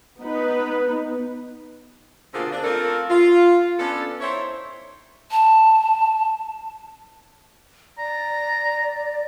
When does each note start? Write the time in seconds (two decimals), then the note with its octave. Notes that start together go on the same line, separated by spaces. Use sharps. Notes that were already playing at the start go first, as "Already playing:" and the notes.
0.20 B3 D#4 B4
2.33 B2 D3 A#3 C4 F4 G#4
2.52 D4
2.64 A3 C4 F4 A4 A#4
3.09 F4
3.79 B3 C#4 D4 A4
4.21 D#4 E4 C5 C#5
5.31 A5
7.98 D5 A#5